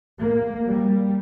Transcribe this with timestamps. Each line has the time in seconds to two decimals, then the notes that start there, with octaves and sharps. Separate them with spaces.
0.19 A#3
0.69 G3